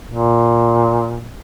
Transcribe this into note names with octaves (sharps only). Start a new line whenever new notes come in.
A#2